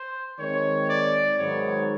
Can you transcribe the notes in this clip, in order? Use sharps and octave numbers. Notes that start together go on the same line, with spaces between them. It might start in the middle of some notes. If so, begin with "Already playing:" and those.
Already playing: C5
D#3 G#3 C4 C#5
D5
G#2 D#3 F#3 B3 C#5